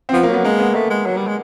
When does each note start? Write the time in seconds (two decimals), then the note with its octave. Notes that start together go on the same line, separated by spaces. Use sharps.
0.09 C4
0.13 F3 B3
0.23 A#3
0.29 F#3 B3
0.44 G#3 A#3
0.60 B3
0.75 A3
0.90 G#3
1.06 F#3
1.17 G3
1.27 G#3